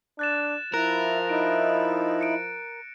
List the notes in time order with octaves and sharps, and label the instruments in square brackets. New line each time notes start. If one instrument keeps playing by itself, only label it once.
[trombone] D4 [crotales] F#6 A6 E7
[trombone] F3 [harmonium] E4 [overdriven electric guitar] A#4 [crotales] F#6 A#6
[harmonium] D#4 E4 [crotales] D7
[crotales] C#7 D7